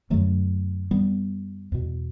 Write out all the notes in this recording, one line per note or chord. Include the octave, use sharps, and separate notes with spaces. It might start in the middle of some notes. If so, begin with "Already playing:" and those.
F#2 D3 F#3 A3
G3 B3
E2 B2